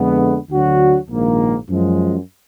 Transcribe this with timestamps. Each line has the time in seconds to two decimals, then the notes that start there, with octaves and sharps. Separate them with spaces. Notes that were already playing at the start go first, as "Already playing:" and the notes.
Already playing: F2 D3 G#3 B3
0.49 D2 D3 F#3 D4 F#4
1.09 A#1 G#2 D#3 A#3
1.69 F#2 F3 G#3